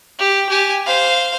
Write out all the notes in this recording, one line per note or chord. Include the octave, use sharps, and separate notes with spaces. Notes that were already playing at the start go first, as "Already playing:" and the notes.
G4
G4 G#5
C5 F5